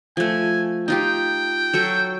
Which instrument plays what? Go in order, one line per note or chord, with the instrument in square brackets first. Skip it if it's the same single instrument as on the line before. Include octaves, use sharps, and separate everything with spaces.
[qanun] F3 A3 [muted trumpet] G#5
[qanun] D#4 F4 G4 [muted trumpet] G5
[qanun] F#3 A4 C#6